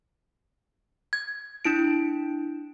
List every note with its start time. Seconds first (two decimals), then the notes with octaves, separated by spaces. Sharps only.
1.13 G#6
1.65 D4 E4 D7